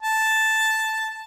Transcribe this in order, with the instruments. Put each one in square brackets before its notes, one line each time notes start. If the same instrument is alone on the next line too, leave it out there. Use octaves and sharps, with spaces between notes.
[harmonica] A5